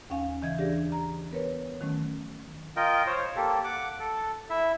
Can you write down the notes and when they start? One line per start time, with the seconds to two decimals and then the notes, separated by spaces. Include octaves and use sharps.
0.10 D#2 C#4 F5 G#5
0.42 C#3 E3 D#5 E5 G#6
0.58 D4 G4 G#4 D5 A#6
0.92 A#5
1.32 B3 A#4 B4 C#5
1.81 D#3 F#3 A3 C#4
2.77 F4 A#4 D#5 G5
3.06 C5 C#5
3.36 A#3 G4 A4
3.64 F#5 D6
3.99 A4
4.50 E4 E5